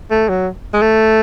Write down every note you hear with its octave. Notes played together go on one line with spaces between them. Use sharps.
A3
F#3
G#3
A3